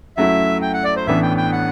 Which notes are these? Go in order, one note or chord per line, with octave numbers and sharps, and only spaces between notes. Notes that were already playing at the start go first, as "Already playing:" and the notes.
F#2 F#3 A3 E4 E5
G5
F#5
D5
C5
A1 A2 E3 B3 D4 E5
G5
G5
F#5